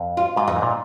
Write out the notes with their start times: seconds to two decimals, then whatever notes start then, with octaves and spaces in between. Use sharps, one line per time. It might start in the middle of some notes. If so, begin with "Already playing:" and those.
Already playing: F2
0.17 F4
0.36 G#2 F4
0.48 F2 D#4
0.56 G#2
0.62 A#2